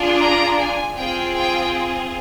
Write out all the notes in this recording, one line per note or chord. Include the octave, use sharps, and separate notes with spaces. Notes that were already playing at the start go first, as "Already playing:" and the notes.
Already playing: D4 F4 G#4
A#5
G#5
C4 F4 G#4 G5
G5